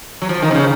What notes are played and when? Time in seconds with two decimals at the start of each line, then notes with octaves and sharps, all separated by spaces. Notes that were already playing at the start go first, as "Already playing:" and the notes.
0.22 F#3
0.29 F3
0.42 D#3
0.51 C3
0.55 C#3